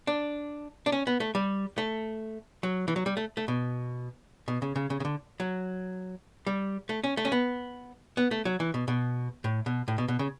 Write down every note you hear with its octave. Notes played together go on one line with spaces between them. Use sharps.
D4
D4
C#4
B3
A3
G3
A3
F#3
E3
F#3
G3
A3
A3
B2
B2
C#3
C#3
C#3
C#3
D3
F#3
G3
A3
C#4
A3
C#4
B3
B3
A3
F#3
E3
B2
B2
A2
B2
A2
B2
B2
C#3